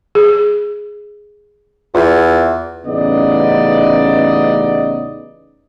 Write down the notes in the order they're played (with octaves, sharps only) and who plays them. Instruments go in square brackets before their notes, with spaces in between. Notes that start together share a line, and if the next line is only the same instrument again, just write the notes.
[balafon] G#4
[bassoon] E2 [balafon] F4
[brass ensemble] A1 C#3 B3 D#4 D5 D#5